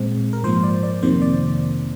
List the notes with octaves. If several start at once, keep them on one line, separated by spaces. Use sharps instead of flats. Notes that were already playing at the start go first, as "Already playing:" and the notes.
Already playing: A#2 G#3 C4
A#4
G#2 F3 A#3 C5
D5
D5
F2 C3 D#3 A#3 C5
D5